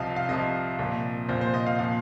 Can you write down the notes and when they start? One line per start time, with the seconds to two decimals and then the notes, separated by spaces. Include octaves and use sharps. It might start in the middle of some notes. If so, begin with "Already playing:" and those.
Already playing: C2 C3 F3 D#5 F5
0.16 F5
0.29 C2 C3 F3 D#5
0.79 C2 A#2 F3
1.29 C2 A#2 F3 C5
1.41 C5
1.54 D#5
1.66 F5
1.79 A#2 F3 F5